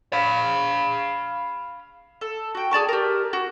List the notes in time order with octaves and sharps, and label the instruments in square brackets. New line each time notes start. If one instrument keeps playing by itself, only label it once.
[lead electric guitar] F5 B5
[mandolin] A4
F#4 G5
G#4 D5 A5 C#6
G4 A#4
F#4